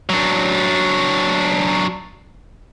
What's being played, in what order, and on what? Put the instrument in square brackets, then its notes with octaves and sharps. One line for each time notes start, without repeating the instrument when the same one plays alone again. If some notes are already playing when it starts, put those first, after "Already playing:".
[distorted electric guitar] F#3 D4